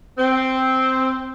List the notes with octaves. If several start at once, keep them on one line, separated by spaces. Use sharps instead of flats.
C4